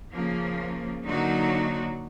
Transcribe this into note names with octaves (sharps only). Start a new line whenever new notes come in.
C#3 F3 A#3
D3 F#3 A#3 D#4 F#4